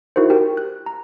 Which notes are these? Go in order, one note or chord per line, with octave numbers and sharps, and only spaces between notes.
D#4 E4 F#4 A#4 C5
G4 A#4 G5
F#6
A#5